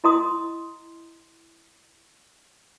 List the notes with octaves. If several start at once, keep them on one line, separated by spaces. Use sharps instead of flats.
E4 D#5 A#5 C6 D#6